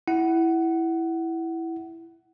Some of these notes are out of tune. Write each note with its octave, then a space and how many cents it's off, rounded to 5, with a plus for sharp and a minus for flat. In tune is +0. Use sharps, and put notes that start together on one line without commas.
E4 +0 F#5 +15